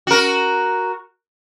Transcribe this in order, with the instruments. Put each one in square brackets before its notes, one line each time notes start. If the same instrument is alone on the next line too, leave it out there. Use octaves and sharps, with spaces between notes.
[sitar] F#4 A#4